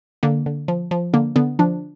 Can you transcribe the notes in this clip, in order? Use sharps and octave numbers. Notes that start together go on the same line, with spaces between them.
D3 A#3
D3
F3
F3
D3 A#3
D3 B3
F3 D4